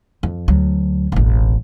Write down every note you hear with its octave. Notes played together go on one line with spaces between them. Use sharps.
F2
D2 F#3
E1 A1